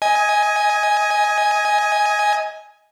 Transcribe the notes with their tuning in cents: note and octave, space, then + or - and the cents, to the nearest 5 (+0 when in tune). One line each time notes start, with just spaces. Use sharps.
D#5 +25 G#5 +0